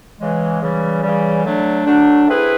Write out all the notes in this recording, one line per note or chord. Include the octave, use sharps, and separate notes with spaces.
C#3 E3 G#3
C#3 E3 G3
C#3 E3 G3
D3 F#3 A3 D4
D3 F#3 A3 D4
A3 C4 E4 G#4 B4